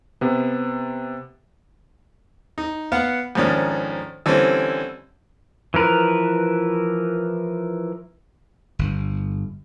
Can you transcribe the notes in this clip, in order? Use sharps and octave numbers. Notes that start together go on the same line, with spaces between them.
C3 B3
D#4
B3 F5 F#5
F2 G#2 D#3 C#4 D4
D3 E3 G3 C4 C#4
E3 F3 A#4 B4
G1